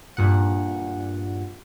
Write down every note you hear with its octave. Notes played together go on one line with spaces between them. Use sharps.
G2 A#2 F#5